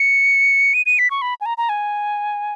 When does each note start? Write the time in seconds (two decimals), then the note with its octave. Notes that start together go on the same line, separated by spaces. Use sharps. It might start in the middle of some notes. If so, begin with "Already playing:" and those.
Already playing: C#7
0.74 D#7
0.86 D#7
0.99 B6
1.11 C#6
1.22 B5
1.41 G#5
1.46 A#5
1.58 A#5
1.69 G#5